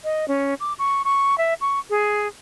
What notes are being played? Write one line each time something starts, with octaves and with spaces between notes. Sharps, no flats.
D#5
C#4
D6
C#6
C#6
E5
C#6
G#4